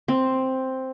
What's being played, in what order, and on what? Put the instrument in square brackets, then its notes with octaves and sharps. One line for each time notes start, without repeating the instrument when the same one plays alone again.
[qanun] C4